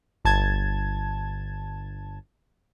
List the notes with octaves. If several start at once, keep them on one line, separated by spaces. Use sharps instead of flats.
G1 A5 G#6